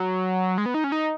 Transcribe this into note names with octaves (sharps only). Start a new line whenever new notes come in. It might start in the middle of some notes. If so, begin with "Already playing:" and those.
Already playing: F#3
G#3
B3
D#4
C#4
D#4